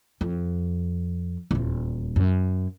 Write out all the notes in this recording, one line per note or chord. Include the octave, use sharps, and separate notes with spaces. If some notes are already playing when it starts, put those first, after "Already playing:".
F2
D#1 E2
F#2